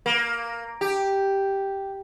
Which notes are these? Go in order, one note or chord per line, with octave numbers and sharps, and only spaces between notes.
A#3
G4